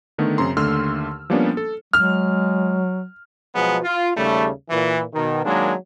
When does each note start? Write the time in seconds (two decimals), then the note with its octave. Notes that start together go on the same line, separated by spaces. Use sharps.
0.18 D3 D#3 A3 B3
0.38 F#2 C#3 C4 A#5 C6
0.57 D#2 D3 A3 C6 E6 F6
1.30 F3 G3 A#3 B3 C#4 D4
1.57 A4
1.93 F#3 G#3 F6
3.55 B2 F3 F#3 G#3 B3
3.84 F4
4.17 D#2 C#3 G3 A3
4.70 A#2 E3
5.14 B2 D#3
5.45 D#3 F#3 G#3 A#3 D4